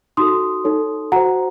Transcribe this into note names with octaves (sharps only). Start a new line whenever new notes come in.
D#4 F#4 A4 C6 D#6
D#4 A4 C#5
F#4 C5 F#5 A#5